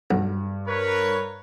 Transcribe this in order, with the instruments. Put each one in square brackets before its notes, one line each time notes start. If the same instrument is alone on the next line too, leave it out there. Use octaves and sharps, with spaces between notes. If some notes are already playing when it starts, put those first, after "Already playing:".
[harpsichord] B1 [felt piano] G2
[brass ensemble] A#4 B4 C#5